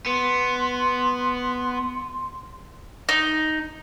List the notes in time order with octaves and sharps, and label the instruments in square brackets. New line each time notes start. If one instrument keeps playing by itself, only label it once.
[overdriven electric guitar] B3 [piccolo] C6
[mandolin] D#4